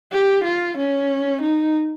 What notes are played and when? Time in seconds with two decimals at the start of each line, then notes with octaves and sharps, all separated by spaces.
0.12 G4
0.44 F4
0.78 C#4
1.42 D#4